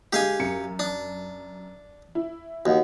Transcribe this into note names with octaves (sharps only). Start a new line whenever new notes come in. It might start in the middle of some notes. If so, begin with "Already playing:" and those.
D3 G#3 G4 F5 G#5
F#2 C#7
D4
E4
D#2 F#4 D#5 F#5